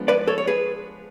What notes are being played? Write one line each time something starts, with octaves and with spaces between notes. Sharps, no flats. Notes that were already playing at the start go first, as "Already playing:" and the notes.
Already playing: F3 G#3 B3 D4
B4 D5
A4 C#5
C#5
G#4 B4